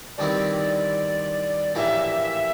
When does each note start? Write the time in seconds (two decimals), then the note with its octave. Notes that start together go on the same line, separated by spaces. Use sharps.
0.17 G2 D#3 G3 C4 E4 D5
1.75 A#1 A2 E3 G3 A#3 E5